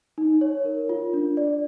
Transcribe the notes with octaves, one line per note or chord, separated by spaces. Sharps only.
D#4
C#5
A#4
F4
D4
D5